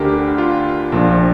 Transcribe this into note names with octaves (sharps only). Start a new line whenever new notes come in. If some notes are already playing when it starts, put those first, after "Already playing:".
Already playing: D2 D3 D4 G4 A#4
F4
A#1 A#2 F3 D4